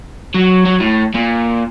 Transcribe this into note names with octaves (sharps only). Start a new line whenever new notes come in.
F#3
F#3
A2
A#2